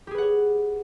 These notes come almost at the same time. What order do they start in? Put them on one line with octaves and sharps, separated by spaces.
G4 G#4 B4 F#5 C#5